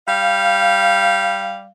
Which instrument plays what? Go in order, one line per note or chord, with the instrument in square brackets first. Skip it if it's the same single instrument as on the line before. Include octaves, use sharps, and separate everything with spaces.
[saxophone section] G3 F5